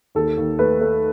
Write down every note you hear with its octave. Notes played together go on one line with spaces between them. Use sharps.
D#2 A4
D#2
A3 B4
A3